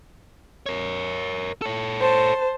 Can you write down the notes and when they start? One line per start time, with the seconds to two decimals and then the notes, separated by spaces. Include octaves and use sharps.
0.66 A#4 C#5
1.62 A4 C#5
2.00 C5 A5